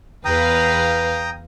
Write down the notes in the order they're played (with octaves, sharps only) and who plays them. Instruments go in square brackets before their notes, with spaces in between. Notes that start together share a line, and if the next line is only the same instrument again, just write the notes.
[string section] E2 B4 F5 [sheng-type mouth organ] G5 A#5 D#6